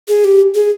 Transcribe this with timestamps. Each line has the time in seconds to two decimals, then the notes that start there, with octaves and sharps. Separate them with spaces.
0.08 G#4
0.24 G4
0.55 G#4